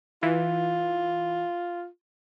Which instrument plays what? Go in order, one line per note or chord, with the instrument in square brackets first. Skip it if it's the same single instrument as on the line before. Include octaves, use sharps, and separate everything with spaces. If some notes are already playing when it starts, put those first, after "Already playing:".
[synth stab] E3 [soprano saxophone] F4